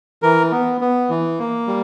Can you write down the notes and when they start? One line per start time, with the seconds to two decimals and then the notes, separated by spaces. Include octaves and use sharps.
0.22 E3 A#4
0.51 B3
0.81 B3
1.10 E3
1.39 A#3
1.67 G3